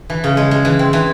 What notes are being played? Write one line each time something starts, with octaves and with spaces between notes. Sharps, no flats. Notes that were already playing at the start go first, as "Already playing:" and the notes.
E3
C#3
G#3
G#3
E3
C4
E3